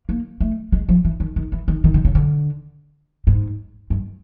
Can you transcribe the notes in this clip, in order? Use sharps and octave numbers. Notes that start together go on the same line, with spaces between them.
A#3
A3
G#3
F3
E3
D#3
D#3
E3
D#3
D#3
D3
C#3
D3
G#2
G2